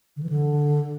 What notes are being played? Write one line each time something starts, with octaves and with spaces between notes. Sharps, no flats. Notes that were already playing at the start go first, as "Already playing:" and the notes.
D3
E3
D3